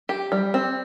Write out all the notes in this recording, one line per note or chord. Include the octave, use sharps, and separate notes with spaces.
G4
G3
C4